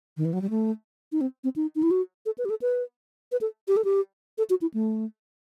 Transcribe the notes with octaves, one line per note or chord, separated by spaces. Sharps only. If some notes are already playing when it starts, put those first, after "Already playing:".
D#3
E3
F#3
G3
A3
D#4
C4
C4
D#4
D#4
E4
F#4
A4
B4
G4
A4
B4
B4
A4
G4
A4
G4
A4
F#4
E4
A3